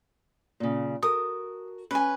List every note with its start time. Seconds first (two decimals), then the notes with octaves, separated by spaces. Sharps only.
0.60 A#2 C#3
1.03 F#4 A4 A#4 D#6
1.91 C#4 B4 G#5